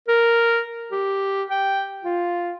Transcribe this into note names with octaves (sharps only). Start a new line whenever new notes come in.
A#4
G4
G5
F4